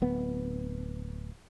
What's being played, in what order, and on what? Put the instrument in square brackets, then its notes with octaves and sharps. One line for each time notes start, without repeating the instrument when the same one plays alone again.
[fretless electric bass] D1 B3